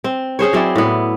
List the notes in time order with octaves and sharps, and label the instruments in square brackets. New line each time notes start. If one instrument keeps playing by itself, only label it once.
[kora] C4
C#4 G#4 C5 C#5
F#3 C4 E4 D5
A2 B3